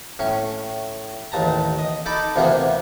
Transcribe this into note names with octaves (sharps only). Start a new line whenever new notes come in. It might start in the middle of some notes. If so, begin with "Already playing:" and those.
A2 C#4
A1 D#2 A5 A#5
D#5
D#4 A4 A5 B5 D6
D2 C3 E3 A#3 B3